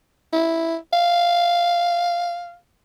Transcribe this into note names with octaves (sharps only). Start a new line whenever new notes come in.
E4
F5